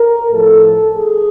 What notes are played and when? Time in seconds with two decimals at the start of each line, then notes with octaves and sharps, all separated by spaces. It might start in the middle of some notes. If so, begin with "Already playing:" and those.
Already playing: A#4
0.31 A2 F3 A4
0.95 G#4